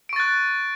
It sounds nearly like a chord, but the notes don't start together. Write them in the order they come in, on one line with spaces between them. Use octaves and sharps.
D7 C#6 A6 F#6